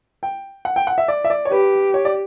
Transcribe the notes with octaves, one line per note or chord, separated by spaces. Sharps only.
G5
F#5
G5
F#5
E5
D5
E5
D5
C#5
G4 B4
C#5
D5